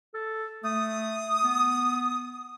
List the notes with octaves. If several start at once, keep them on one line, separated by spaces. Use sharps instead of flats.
A4
A3 D#6
B3